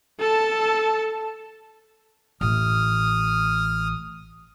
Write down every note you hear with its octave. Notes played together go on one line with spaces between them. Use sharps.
A4 A5
A1 D#6 F6